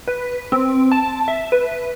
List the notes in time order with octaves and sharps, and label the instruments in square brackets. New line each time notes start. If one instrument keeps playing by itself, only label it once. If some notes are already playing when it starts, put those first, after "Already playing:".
[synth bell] B4
C4
A5
E5
B4